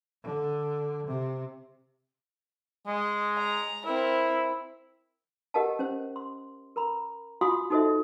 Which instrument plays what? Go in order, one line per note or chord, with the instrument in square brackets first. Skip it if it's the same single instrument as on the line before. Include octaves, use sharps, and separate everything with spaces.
[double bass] D3
C3
[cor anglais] G#3 [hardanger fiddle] D#5
[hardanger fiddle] A#5
[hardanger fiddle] C4 A#4 [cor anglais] E4
[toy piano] G4 A#4 D#5 F5 F#5 A5
C#4 C5
C6
A#4 A#5 B5
F4 F#4 F5 G#5 C6 D#6
D#4 F#4 A4 C5 D#5 E5